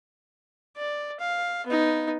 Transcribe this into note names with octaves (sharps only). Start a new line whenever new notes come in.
D5
F5
B3 D#4